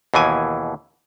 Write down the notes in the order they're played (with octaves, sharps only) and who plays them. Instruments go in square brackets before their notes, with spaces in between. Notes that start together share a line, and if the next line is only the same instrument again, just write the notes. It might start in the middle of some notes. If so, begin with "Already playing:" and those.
[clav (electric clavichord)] D#2 B2 E3 G#5